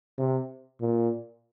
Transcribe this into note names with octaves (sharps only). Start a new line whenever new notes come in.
C3
A#2